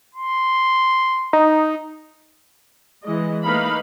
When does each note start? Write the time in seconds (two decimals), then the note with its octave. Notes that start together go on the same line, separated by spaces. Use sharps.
0.15 C6
1.33 D#4
3.02 E3 G#3 D#5
3.44 A3 A#3 D#4 B4 F5 B5